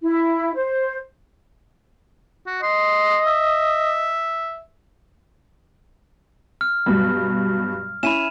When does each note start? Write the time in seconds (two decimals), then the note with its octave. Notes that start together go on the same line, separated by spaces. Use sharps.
0.01 E4
0.54 C5
2.46 F#4
2.62 D#5 C6
3.26 E5
6.61 F6
6.86 G2 B2 F#3
8.03 C#4 E4 B5 D#7 E7